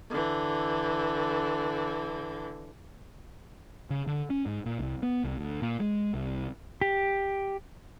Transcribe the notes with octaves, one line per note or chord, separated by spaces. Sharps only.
D3 E3
C#3
D3
C#4
G#2
A#2
C2
B3
C2
D2
A#2
G#3
C2
G4